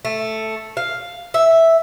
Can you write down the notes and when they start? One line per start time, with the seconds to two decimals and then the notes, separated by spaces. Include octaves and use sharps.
0.05 A3
0.77 F5
1.34 E5